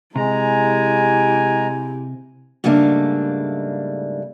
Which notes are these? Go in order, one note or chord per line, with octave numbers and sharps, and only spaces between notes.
C3 G#3 E4 G4 G#5 A#5
G#2 C#3 G3 A3 A#3 D4